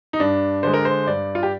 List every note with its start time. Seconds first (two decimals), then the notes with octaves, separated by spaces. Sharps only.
0.13 D#4
0.20 G2 D4
0.63 D3 G#3 C5
0.73 A#4
0.85 C5
1.06 G2 D5
1.35 F4
1.43 G4